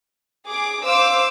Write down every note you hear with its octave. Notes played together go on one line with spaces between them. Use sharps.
G#4 D6
C5 F5 D6 E6